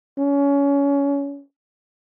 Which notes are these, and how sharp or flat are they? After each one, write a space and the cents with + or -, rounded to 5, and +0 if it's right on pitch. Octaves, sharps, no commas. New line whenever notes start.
C#4 +25